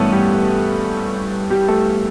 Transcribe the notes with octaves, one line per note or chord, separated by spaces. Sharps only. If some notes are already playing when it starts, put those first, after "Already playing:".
Already playing: G2 E3 A3 B3 C#4 A4 B4 C#5
G3 G4
G3 G4
A3 A4